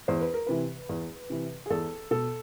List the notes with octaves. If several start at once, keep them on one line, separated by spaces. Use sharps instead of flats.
E2 C5
B4
A#4
C3 E3 B4
E2
C3 E3
G#4
E2 A4
B2 A4